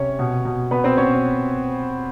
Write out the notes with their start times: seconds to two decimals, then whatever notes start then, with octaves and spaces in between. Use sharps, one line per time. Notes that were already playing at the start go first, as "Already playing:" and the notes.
Already playing: C3 C#4 C#5
0.19 B2
0.45 B2
0.71 B2 B3 B4
0.84 C4 C5
0.97 B2 C#4 C#5